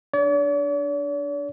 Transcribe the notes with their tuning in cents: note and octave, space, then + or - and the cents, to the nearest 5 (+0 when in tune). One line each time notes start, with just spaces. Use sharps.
D4 +0 D5 -45